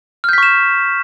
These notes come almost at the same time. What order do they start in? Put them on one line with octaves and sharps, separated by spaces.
F6 G6 B6 C#6 E7